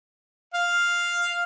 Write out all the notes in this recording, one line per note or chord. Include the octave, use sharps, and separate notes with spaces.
F5